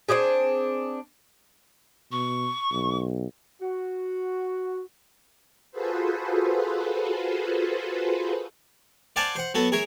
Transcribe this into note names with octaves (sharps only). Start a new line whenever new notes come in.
C4 D4 G4 G#4
B2 C#6
B1
F#4
F4 F#4 G#4 A4 B4 C5
C5 D5 F5 F#5 G#5 A5
C5 F#5
F#3 B3 F#4 A4
G#4 A#4 C#5 E5